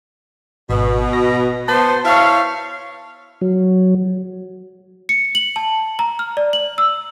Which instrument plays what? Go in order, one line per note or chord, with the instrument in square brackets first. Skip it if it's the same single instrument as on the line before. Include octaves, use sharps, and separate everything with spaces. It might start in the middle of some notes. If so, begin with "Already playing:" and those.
[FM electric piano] G#1 [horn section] B2
[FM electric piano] A#6
[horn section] B3 C5 [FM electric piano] A5
[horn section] E4 C#5 F5
[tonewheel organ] F#3
[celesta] C#7
F#7
A5
A#5
F6
D5
F#7
E6